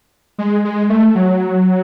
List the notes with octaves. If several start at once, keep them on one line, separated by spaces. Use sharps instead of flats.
G#3
G#3
A3
F#3